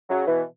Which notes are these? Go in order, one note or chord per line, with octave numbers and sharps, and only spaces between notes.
C#3 F#3
B2 E3